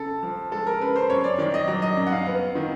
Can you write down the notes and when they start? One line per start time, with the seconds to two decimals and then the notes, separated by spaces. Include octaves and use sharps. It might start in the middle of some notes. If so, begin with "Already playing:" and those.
Already playing: C#3 A4
0.23 F3
0.52 G#3 A4
0.66 A#4
0.80 C#3 B4
0.96 C5
1.10 F#2 C#5
1.24 D5
1.38 D#3 D5
1.54 D#5
1.68 F#3 D5
1.82 D#5
1.97 F#2
2.07 F#5
2.12 F5
2.26 B3 F#5
2.55 D#3